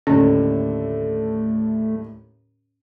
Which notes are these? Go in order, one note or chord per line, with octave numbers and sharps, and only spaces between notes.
D#2 A2 D3 A3 C#4